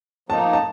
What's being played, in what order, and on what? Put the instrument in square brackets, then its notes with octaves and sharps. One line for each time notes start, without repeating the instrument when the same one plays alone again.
[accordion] F3 A#3 D#4 [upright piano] A5
[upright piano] A5